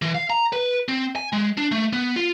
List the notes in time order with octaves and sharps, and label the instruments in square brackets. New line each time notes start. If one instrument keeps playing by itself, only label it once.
[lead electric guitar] E3
F5
A#5
B4
C4
G#5
G#3
D4
A3
B3
F4